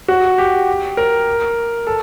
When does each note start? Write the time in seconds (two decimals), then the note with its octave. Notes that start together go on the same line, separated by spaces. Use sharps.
0.08 F#4
0.38 G4
0.97 A#4
1.87 A4